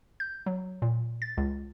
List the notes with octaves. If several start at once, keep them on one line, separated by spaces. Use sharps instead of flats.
G6
F#3
A#2
A6
C#2